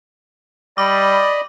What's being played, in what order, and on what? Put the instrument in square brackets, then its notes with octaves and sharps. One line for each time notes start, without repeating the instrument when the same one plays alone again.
[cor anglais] G3 [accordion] D5 B5 [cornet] D#5 [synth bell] D6